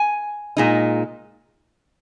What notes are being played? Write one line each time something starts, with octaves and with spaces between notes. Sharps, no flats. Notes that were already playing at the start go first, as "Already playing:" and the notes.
Already playing: G#5
A#2 G#3 D#4